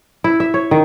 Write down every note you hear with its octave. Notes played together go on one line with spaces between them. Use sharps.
E4
E5
C#5
D#3